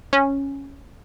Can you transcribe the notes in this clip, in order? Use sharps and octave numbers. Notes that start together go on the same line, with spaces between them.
C#4